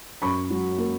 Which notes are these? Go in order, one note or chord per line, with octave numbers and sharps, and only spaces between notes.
F#2 B5 C#6
F#3
A#3